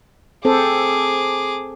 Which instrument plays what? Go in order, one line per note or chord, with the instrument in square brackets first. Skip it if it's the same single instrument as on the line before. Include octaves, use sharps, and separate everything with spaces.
[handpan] C4 A4 C5 [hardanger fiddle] G#4 D6